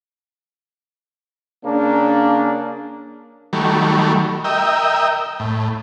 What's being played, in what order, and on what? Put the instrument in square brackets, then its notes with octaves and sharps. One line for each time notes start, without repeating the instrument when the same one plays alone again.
[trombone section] C#3 A#3 D4
[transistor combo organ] D#3 F#3 G3 A3
A#4 D#5 E5 G5
A2